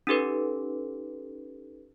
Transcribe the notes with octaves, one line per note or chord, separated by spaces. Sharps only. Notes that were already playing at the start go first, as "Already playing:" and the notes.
C#4 D#4 G4 A4 B4